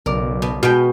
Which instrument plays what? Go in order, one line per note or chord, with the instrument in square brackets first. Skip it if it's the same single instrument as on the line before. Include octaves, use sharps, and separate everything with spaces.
[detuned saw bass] B1 [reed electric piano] C#3 D5 D6 [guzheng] A#4
[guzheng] B2
[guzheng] B2 G#3 G5 [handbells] F#4 [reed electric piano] G#5 B5 F6